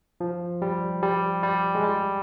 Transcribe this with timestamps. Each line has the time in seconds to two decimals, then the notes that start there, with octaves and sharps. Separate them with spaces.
0.20 F3
0.62 G3
1.02 G3
1.43 G3
1.75 G#3
1.84 G3